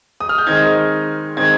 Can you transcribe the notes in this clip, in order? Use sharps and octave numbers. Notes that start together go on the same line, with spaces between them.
D#6
F6
G6
D#3 G#3 C4 D#4 G#6
D#3 G#3 C4 D#4 G#6